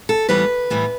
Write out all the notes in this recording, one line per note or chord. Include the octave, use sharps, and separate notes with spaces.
A4
A2 E3 G3 B3 B4
A2 E3 G3 B3